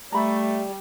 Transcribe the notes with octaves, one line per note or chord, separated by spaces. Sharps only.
G3 A3 A#5 B5